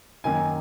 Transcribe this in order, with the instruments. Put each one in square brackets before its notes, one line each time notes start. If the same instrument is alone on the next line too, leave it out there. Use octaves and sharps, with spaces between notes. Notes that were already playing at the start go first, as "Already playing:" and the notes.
[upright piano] F#2 D#3 A#3 G#5